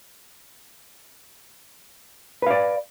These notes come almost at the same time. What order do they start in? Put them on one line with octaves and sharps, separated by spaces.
B4 F5 D5